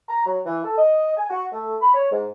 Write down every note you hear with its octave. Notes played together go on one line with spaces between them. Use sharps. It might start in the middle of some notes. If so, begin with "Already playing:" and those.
A#5
F#3
E3
A4
D#5
G#5
F#4
A3
B5
C#5
G#2